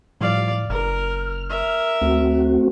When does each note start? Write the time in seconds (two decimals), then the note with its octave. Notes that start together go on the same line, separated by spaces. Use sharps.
0.21 A2 F3 G3 D5 F5
0.70 F#1 A#4 F6
1.50 A#4 E5
2.02 D2 A3 C4 F#4